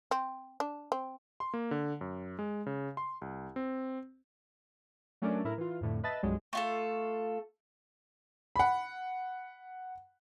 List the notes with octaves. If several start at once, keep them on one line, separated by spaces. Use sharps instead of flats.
C4
D4
C4
C6
A#3
D3
F#2
G#3
C#3
C6
C2
C4
F#3 A3 C#4 D4 A#4 D5
A2 E4 A#4
E3 F4
F2 A2 D3
B4 D#5 E5 A5 A6
C2 G2 F#3 G#3
A3 F4 A4
F#5 B5